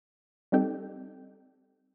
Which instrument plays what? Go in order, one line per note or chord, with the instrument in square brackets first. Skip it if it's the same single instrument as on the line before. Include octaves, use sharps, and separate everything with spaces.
[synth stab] G3 C4 D#4 G4 A4